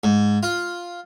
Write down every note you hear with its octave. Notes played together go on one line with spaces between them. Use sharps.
G#2
F4